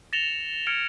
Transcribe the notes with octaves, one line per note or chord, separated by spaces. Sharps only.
A6 A#6 C#7 E7 F7 G7
F6 G#6 C#7 D7 G7